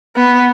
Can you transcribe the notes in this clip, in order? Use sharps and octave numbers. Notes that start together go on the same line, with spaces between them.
B3